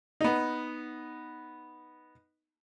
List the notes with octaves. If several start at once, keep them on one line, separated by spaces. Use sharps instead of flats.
B3 D#4